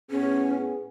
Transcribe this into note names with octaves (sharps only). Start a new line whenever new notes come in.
A2 B3 C#4 G#4